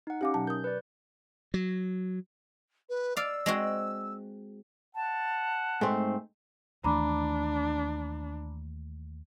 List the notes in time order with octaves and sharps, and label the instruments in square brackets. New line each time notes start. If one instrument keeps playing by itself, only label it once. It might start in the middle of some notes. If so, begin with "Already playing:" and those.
[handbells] D#4 F#5
[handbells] C#4 D#4 [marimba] G4 F5 D6
[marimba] B2 F#3 A5
[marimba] A#4 D#6 [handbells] G6
[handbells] B4 D5
[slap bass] F#3
[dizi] B4
[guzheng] D5 F5 [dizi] E6
[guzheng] G#3 C4 F#4
[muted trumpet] F#5 [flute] A5
[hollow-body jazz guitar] G#2 [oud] A3 C4
[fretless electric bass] D#2 E3 A3 [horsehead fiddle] D4 [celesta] A#5 B5 D6